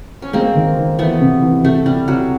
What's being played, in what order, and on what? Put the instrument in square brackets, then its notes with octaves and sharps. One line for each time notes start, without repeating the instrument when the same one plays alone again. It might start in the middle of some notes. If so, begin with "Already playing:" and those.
[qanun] C#4
[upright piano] G#3 [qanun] A#3 C4
[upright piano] D#3
D#3
[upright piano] E3 [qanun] A3 B3
[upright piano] C3
E3
[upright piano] C3 [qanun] A3
[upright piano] C3 [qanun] G3
[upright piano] C3 [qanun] F#3